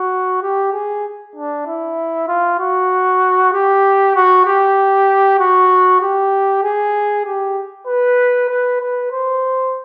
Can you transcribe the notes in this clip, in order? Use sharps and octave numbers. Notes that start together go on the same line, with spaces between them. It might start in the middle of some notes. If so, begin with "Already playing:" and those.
Already playing: F#4
G4
G#4
D4
E4
F4
F#4
G4
F#4
G4
F#4
G4
G#4
G4
B4
B4
B4
C5